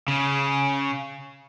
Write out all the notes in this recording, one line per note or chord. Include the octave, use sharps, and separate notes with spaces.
C#3